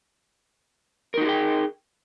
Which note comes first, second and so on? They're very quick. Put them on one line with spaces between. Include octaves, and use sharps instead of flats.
A#4 D#4 F#4 G#4 G5